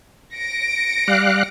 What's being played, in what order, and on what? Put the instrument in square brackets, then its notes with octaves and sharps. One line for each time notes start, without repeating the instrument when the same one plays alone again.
[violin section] A#6 C#7 D7
[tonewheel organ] G3 F5 F#6